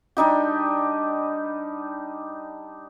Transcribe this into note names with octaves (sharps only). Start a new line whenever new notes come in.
G3 D4 D#4 G4